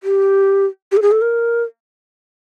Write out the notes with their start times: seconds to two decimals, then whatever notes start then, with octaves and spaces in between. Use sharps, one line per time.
0.03 G4
0.92 G4
0.97 A4
1.02 G#4
1.12 A4
1.22 A#4